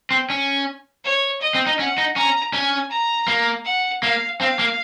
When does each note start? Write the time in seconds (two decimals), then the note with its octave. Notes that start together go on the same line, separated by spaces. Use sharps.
0.11 C4
0.30 C#4
1.04 C#5
1.41 D#5
1.55 C4
1.67 D#4
1.79 C#4 F#5
1.98 D#4
2.16 C#4 A#5
2.53 C#4 G#5
2.91 A#5
3.28 A#3
3.65 F#5
4.03 A#3 F5
4.40 C4 F5
4.59 A#3